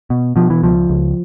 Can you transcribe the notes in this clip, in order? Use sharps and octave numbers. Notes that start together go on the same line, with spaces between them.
B2
B2 F3
E3
C#2 F3
C#2